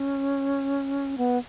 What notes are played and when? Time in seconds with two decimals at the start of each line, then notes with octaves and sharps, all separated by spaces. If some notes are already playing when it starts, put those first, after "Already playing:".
Already playing: C#4
1.18 B3